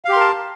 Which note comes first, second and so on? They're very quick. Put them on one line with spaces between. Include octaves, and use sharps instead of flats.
F5 G4 C6 A#4 A5